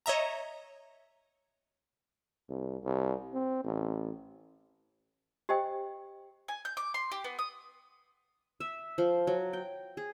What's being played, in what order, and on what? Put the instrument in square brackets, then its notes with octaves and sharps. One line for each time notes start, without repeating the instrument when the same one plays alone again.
[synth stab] C#5 D#5 E5 A#5
[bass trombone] C2
C2
C4
A1
[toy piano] G4 C5 D#5 G5
[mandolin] G#5
G6
D6
C6
G4
B3
D#6
[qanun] E5
F3
F#3
G5
G#4